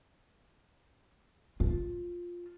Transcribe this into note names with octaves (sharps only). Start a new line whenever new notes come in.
F4